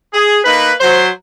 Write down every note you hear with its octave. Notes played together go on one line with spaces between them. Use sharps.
G#4
A#3 D#4 B4
F#3 C5